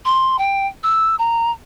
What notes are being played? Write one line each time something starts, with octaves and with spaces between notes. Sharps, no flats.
C6
G5
E6
A#5